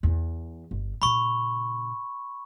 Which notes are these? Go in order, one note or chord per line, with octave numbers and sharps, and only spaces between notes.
E2
G1
A#2 C#3 B5 C#6